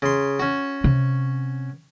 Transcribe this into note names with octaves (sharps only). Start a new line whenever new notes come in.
C#3 C6
C#4 F#4
C3